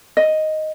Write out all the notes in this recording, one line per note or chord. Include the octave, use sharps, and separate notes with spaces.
D#5